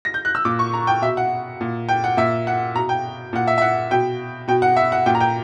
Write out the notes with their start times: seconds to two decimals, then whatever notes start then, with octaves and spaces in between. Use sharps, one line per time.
0.05 A#6
0.14 G6
0.25 F#6
0.35 E6
0.45 A#2 D6
0.59 C#6
0.74 A#5
0.87 G5
1.02 B2 E5
1.17 F#5
1.61 A#2
1.89 G5
2.04 F#5
2.17 A#2 E5
2.47 F#5
2.75 B2 A#5
2.89 G5
3.33 A#2 F#5
3.47 E5
3.58 E5
3.62 F#5
3.91 B2 G5
4.48 B2 G5
4.62 F#5
4.77 E5
4.92 F#5
5.06 A#2 G5
5.15 A#5
5.20 G5